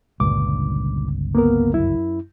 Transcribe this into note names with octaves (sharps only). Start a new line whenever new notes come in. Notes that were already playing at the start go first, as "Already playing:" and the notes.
G1 C#2 G2 A#2 D6
A#3 B3 A#4
F#2 E4